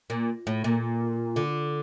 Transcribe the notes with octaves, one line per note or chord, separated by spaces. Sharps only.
A#2
A2
A#2
D3